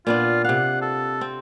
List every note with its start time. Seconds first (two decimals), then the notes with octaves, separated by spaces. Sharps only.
0.07 A#2 B3 D4 F4
0.44 C3 F5 F#5
0.82 A4
1.21 C4